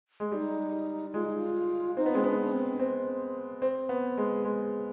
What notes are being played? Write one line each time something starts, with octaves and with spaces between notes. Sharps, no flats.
G#3
G3 D#4
G#3 F4
D#4
F4
C4 D#4
B3
G#3 C4
B3 D4
D4
C4
C4
C4
B3
G#3
G#3